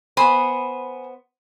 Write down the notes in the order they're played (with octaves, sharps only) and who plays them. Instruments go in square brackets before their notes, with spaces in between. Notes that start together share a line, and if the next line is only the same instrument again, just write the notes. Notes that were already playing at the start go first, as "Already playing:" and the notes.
[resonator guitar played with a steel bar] B3 C5 [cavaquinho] G#5 B5 D#6